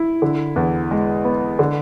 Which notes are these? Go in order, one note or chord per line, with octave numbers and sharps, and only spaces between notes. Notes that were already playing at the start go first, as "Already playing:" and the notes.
Already playing: E4
D3
E2
G#3
B3
D3